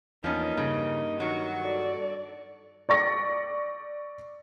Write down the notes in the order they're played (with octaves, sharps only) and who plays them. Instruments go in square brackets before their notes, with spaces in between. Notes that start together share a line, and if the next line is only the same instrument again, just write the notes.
[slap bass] E2 [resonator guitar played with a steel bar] F3 B3 C#4 [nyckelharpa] A#3 D#4
[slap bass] G2 [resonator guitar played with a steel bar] C#3
[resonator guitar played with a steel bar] D#3 F#3 [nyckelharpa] F#4 C#6
[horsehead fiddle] A4 D5
[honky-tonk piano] D5 C#6 A#6